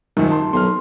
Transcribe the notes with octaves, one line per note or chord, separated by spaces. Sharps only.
D#1 F#2 D#3
A5 C6
B1 C6 F6